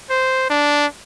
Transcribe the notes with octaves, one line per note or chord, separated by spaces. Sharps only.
C5
D4